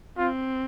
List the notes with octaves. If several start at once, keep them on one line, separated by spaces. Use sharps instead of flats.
C4 F4